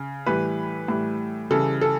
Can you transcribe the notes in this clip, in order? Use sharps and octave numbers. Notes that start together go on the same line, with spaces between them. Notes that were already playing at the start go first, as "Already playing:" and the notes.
Already playing: C#3
A2 E3 G3 B4
A2 E3 G3
C#3 E3 G3 A4
A4